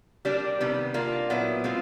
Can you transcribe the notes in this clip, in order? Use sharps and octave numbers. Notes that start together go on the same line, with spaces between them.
G3 A#3 D4 G4
C3 D#3 G3 B3
A#3 D4 F4
A#2 F#3 B3 E4
G#3 C4 F4